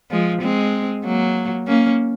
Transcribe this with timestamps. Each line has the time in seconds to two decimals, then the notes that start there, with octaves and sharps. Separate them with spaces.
0.11 F3 G#3
0.42 G#3 C4
1.04 F#3 A#3
1.67 A#3 C#4